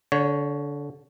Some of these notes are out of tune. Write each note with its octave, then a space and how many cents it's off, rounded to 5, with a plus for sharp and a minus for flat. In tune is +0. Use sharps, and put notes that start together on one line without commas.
D3 -20 C#5 +10